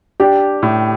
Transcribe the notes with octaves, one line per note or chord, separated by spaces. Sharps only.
D4 G4 G5
A2